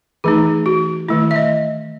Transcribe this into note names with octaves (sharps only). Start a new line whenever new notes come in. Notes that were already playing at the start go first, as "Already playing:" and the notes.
E3 A3 D#4 G#4
F#4
D#3 A3 E4
E5
D#5